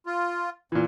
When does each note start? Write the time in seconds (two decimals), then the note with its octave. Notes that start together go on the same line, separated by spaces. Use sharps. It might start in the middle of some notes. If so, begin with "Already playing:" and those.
0.06 F4
0.72 F2 A#2 E3